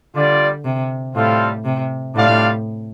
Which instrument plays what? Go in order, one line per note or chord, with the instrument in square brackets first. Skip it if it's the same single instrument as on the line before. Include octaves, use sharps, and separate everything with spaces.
[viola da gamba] D3 [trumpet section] G3 F4 D5
[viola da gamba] C3
[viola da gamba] A2 [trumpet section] G3 C4 F4 A4 F5
[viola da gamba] C3
[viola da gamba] A2 [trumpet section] G3 D4 F4 D5 F5